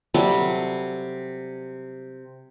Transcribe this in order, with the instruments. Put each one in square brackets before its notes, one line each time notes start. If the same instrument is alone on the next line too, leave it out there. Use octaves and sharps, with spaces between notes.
[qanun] C3 F#3 G3 A4